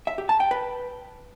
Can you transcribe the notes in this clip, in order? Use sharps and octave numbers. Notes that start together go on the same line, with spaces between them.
E5
G4
A5
G5
B4